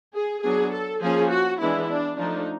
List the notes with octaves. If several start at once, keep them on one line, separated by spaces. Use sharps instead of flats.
G#4
F#3 B3 D4 G#4
A4
F3 A#3 C#4 G#4
F#4
E3 G#3 B3 D4 E4
D4
F3 A3 D4 D#4